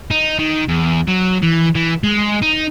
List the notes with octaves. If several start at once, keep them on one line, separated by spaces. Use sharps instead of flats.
D#4
D#3
E2
F#3
E3
E3
G#3
D#4